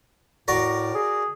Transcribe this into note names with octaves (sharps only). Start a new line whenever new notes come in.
A2 F#4 A#4 D5
G#4